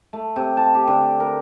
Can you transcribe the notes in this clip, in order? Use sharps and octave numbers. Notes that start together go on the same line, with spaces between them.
A3
C3
A5
G4
D3
A#4